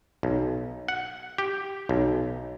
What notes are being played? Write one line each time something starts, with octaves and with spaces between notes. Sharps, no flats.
B1
F#5
G4
B1